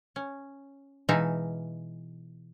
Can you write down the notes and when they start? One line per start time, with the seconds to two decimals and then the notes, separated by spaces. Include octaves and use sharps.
0.16 C#4
1.09 B2 E3 G#3 D#4 E5 F5